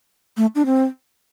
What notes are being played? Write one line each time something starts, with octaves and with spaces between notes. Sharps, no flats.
A3
D4
C4